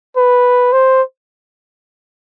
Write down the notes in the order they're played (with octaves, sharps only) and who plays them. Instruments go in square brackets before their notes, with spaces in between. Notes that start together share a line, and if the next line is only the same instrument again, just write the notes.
[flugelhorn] B4
C5